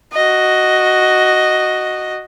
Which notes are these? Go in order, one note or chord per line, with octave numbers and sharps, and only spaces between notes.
F#4 D#5